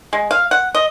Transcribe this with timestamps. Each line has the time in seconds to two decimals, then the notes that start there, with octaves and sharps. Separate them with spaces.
0.13 G#3
0.31 F5
0.51 F#5
0.75 D#5